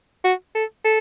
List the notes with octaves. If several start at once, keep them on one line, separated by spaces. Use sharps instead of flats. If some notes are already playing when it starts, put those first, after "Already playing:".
F#4
A4
A4